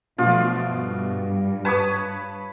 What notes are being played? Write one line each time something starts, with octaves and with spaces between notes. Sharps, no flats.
B2 F3 A3 F4 D5
G2
B4 C#5 A5 B5 D#6